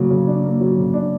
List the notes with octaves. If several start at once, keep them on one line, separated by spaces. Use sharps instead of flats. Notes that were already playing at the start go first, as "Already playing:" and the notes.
Already playing: C#3 F#3 A#3
C#3
D4
A#3
F#3
C#3
D4